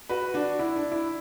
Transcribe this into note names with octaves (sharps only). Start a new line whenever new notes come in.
F#4 B4
D4 F#4
E4
D4
E4